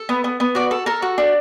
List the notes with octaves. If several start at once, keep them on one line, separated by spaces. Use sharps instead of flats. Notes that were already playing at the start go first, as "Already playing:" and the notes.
Already playing: A4
B3
B3
B3
F#4 D5
A4
A4 A#4
F#4
D4